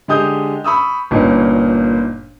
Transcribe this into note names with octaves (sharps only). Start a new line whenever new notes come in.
D3 G#3 G4 D#6 G6
B5 C#6 D#6 E6
G1 A#2 A#3 C#4 D#4